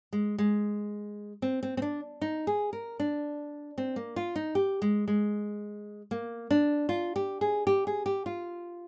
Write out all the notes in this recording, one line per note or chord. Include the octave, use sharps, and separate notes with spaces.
G#3
G#3
C4
C4
C4
D4
D#4
G#4
A#4
D4
C4
A#3
F4
D#4
G4
G#3
G#3
A#3
D4
F4
G4
G#4
G4
G#4
G4
F4